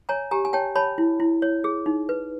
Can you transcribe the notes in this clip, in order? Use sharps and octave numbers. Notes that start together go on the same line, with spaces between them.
C#5 G#5 A#5
G4 G#5 A#5
G#5
C#5 G5 A5
C#5 A5 B5
E4
E4
C#5
G#4
D#4
B4